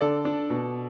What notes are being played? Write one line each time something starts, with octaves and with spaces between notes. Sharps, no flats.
D3 A4 D5
D4
B2